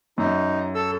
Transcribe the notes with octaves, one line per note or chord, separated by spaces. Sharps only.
F#2 D#4
A4 E6